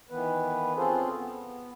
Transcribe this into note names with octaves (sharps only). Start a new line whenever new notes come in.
D#3 E3 B3 B4
C4 C#4 F4 G#4 A4 C5
B3